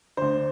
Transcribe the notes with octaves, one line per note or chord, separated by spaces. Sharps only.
D2 D3 C5